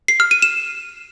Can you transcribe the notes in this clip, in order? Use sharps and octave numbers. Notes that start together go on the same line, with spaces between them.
C7
F6
D#7
E7